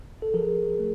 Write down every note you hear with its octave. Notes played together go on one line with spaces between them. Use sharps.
A4
F3 G#4 A#4
A3